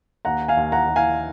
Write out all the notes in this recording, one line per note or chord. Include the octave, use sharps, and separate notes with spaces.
D#2 F#5 A#5
F5 G#5
D#2
F#5 A#5
D#2
F5 G#5